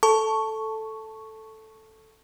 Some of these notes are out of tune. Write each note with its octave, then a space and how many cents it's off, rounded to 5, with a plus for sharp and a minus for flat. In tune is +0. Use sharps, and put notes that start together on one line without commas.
A4 +0 A5 +0 C#6 +0